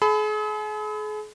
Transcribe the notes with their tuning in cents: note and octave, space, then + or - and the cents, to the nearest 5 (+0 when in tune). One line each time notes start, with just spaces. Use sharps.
G#4 +40 B5 +35